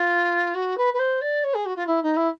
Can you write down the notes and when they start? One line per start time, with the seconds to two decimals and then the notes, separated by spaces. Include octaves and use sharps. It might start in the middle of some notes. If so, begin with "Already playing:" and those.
Already playing: F4
0.54 F#4
0.77 B4
0.93 B4
0.99 C5
1.21 D5
1.43 C#5
1.54 G#4
1.65 F#4
1.76 F4
1.86 E4
2.02 D#4
2.16 E4